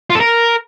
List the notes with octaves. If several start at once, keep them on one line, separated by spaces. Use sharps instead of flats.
F4
A4
A#4